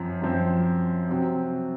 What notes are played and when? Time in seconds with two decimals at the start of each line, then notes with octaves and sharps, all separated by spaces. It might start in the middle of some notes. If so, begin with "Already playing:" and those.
Already playing: F#2 F3 C4
0.22 F#2 F3 C4
1.09 C3 F#3 C4